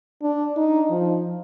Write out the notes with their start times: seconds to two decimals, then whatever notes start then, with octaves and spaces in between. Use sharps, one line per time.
0.22 D4
0.57 D#4
0.90 F3